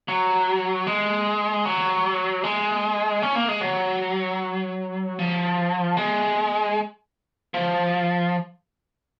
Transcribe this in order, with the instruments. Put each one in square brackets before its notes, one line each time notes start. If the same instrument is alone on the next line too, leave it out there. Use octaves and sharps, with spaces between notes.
[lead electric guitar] F#3
G#3
F#3
G#3
C#4
A#3
G#3
F#3
F3
G#3
F3